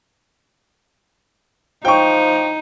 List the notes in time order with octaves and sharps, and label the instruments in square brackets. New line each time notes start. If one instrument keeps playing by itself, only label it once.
[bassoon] F3 [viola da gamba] D#4 [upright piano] G5 C#6